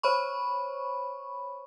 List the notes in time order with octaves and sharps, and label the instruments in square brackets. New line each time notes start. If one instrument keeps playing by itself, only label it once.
[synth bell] C5 C#5 B5 C#6